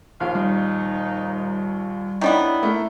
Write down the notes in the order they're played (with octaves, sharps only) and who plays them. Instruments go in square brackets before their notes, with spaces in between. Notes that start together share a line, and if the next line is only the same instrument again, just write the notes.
[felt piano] A#1 D#2 A#2 [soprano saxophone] F5
[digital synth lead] G3 [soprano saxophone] D#4
[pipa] D#3 G3 B3 [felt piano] D4 C#5 [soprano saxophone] E4
[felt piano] A3 A#3